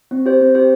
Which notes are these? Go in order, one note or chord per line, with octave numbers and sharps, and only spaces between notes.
C4
G4 C5
C4
G4 C5